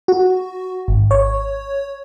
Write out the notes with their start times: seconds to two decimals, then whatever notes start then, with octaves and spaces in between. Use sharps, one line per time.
0.08 F#4
0.88 G#1
1.11 C#5